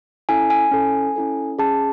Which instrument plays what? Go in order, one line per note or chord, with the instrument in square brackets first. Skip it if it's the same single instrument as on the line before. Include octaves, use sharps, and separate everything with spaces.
[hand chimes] C#4 E4 A4 G#5
G#5
C#4 E4 A4
C#4 E4 A4
C#4 G#4 A5